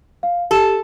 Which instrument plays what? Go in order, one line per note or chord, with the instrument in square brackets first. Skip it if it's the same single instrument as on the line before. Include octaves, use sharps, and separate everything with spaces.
[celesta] F5
[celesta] G4 E7 [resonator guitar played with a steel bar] A4